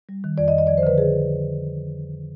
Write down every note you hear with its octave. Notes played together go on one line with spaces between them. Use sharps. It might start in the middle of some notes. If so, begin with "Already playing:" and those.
G3
D#3
F2 D5
D#5
F2
D#5
F3 D5
C5
D3 B4
G#4